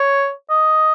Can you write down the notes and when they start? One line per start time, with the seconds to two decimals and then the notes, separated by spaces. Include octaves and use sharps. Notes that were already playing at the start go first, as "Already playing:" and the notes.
Already playing: C#5
0.50 D#5